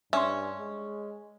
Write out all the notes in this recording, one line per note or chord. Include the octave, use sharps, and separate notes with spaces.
G2 C#4 E5 G#5 C6
G#3